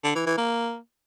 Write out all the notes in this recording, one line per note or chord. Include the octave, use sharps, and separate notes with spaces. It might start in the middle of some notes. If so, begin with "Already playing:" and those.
D3
E3
E3
A#3